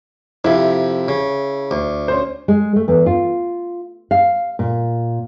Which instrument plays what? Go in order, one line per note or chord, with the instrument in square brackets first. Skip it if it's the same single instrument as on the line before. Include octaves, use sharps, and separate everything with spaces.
[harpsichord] F2 C3 [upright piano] E4
[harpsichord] C#3
D2
[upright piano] C#4 C5
[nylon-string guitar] G#3
A3
E2
F4
F5
A#2